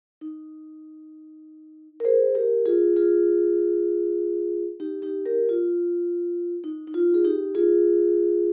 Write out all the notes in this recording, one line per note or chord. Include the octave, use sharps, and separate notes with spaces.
D#4
A#4
G#4 C5
G4 A#4
F4 G#4
F4 G#4
D#4 G4
D#4 G4
G4 A#4
F4
D#4
D#4
F4
G#4
D#4 G4
F4 G#4